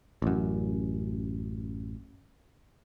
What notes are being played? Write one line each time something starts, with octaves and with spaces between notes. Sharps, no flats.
A1 F#2